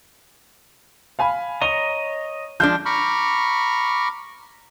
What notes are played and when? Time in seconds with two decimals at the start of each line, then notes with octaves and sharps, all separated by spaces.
1.19 F5 G#5 B5
1.62 C#5 D#5 A#5 G7
2.60 F3 G#3 D4 G6
2.86 A#5 B5 C#6 D6 F6